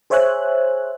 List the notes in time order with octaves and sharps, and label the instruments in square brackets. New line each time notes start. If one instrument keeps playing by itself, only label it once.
[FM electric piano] G#4 C5 C#5 E5 G#5 F#6